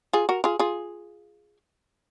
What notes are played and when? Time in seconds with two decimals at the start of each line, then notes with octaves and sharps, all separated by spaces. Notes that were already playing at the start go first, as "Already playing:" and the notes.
0.13 F4 G#4
0.29 F#4 A#4
0.44 F4 G#4
0.59 F4 G#4